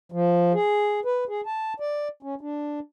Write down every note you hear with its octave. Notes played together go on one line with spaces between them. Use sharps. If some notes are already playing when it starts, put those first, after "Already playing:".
F3
G#4
B4
G#4
A5
D5
C#4
D4